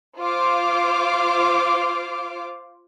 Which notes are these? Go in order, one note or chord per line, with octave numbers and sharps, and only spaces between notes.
F4 C5 F5 D6